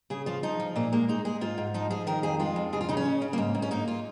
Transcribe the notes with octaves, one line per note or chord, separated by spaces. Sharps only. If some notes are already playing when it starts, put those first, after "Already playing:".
C#3 G#4
F3 F4
F3 D#4
F3
A#2 A#3
G#3 A#3
G#3 D#4
G#3 G#4
G#2 F4
G#2
F3 D#4
F3 G#4
D#3 A#4
F2 G#4
G#3 F4
F2
C#3 G#4
F4
C#3 D#4
C#4
C#3
C#3
A#3
G#2 C#4
G#2
C#4
A#3 D#4
F4